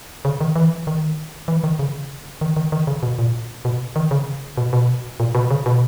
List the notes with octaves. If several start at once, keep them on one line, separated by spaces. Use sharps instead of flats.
C#3
D#3
E3
D#3
E3
D#3
C#3
D#3
D#3
D#3
C#3
B2
A#2
B2
D#3
C#3
B2
B2
A#2
B2
C#3
B2